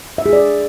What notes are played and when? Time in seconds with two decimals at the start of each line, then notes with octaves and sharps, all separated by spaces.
0.18 E5
0.26 G#4
0.33 D5